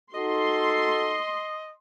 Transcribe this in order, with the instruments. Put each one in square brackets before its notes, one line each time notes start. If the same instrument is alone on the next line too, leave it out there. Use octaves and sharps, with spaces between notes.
[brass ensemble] D#4 F#4 A4 [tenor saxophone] D#5 [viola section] C6